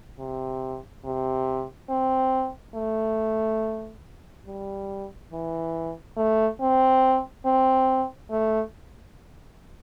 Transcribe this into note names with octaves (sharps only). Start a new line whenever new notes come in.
C3
C3
C4
A3
G3
E3
A3
C4
C4
A3